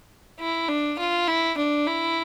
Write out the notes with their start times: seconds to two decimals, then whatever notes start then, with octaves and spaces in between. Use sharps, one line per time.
0.40 E4
0.69 D4
0.99 F4
1.28 E4
1.58 D4
1.87 E4